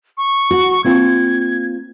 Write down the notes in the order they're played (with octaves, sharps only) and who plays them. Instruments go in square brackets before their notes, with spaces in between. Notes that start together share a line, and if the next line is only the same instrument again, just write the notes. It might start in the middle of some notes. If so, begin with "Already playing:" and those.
[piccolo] C#6
[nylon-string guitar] F#4
[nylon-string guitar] A#3 C4 F4 [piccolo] G#6